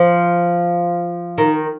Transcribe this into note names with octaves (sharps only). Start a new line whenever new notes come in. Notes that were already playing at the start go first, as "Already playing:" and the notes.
Already playing: F3
D#3